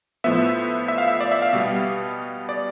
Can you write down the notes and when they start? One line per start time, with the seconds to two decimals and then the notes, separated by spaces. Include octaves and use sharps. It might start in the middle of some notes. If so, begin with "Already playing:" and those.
0.24 A2 F3 B3 E5
0.88 E5
0.98 F5
1.08 E5
1.20 D5
1.32 E5
1.42 F5
1.53 B2 G3 B3 F5
2.49 D5